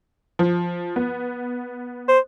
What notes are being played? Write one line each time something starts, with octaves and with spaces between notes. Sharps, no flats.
F3
B3
C5